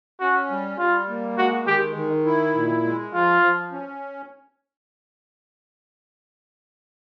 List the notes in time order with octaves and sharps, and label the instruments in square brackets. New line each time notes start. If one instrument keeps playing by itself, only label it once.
[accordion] C#4 [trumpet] F#4
[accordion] G3
[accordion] G3 [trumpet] F4
[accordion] A#3
[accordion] G#3 [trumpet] F#4
[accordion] D#3 [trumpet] G4
[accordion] D#3
E4
A#2
G#3
[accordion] F3 [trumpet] F4
[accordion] F3
C#4